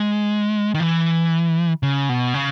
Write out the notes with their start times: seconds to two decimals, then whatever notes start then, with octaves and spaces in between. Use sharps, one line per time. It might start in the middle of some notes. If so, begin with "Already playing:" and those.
Already playing: G#3
0.75 D#3
0.80 E3
1.83 C#3
2.09 B2
2.34 C#3